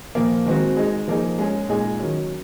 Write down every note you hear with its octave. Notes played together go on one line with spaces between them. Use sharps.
A#2 F3 A#3
D#3 G#3 C4 F#4
G#3 D#4 G#4
F3 A#3 D#4 G#4
G#3 C#4 G#4
A#2 G#3 D#4 G#4
D#3 F#3 C#4